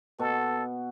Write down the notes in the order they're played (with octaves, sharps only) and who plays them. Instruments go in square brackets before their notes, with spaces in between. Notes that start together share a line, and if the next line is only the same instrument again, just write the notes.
[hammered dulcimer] B2 [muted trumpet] A4